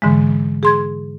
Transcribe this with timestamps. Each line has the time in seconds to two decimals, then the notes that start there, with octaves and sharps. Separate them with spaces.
0.02 G#2 D3 E3 G#3
0.63 G#4 C6 G#6